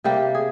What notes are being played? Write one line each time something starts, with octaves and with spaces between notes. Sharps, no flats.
C3 G3 A#3 G4
G#4